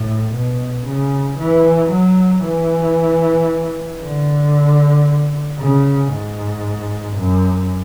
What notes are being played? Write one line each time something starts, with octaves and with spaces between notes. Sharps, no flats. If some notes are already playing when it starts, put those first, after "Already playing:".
Already playing: A2
B2
C#3
E3
F#3
E3
D3
C#3
G#2
F#2